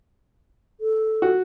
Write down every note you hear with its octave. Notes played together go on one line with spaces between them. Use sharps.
A4
F#4